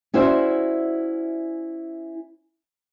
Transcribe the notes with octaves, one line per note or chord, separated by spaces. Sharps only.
C#4 E4 F#4 C5 D5 E5